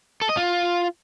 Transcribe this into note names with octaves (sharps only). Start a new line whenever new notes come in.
A4
D#5
F4